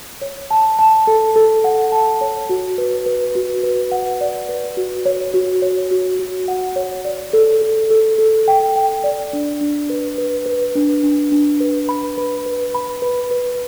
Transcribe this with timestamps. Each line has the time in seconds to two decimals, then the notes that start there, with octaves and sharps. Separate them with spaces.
0.21 C#5
0.51 A5
0.79 A5
1.07 A4
1.36 A4
1.64 F#5
1.92 A5
2.21 C#5
2.49 F#4
2.78 B4
3.06 B4
3.35 F#4
3.63 B4
3.92 F#5
4.21 D5
4.49 B4
4.77 F#4
5.06 C#5
5.34 F#4
5.62 C#5
5.91 F#4
6.19 F#4
6.48 F#5
6.76 C#5
7.05 D5
7.33 A4
7.62 A4
7.91 A4
8.18 A4
8.48 G5
8.76 G5
9.04 D5
9.33 D4
9.61 D4
9.90 B4
10.18 B4
10.46 B4
10.75 D4
11.03 D4
11.32 D4
11.60 B4
11.89 B5
12.17 B4
12.46 B4
12.75 B5
13.02 B4
13.31 B4